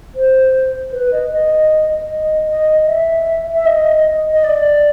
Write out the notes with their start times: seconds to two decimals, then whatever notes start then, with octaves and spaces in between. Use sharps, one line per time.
0.15 C5
0.93 B4
1.12 D#5
1.32 D#5
2.10 D#5
2.49 D#5
2.87 E5
3.54 E5
3.66 D#5
4.33 D#5
4.44 D5